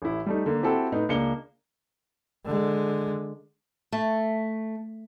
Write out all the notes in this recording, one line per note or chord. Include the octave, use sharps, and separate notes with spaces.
A1 E4
G3 A3 D#4
D3 A#3
C4 E4 F#4 G4 A4 G5
A2 B3 D#4
C#2 A#3 D4 C#7 G7
D3 G#3
A3